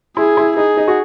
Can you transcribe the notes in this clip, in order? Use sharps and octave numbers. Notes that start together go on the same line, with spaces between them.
E4 G#4
E4
D#4 G#4
D#4
F#4